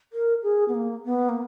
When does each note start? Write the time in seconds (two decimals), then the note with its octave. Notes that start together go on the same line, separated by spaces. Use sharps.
0.13 A#4
0.43 G#4
0.68 B3
0.74 A#3
1.05 B3
1.29 A#3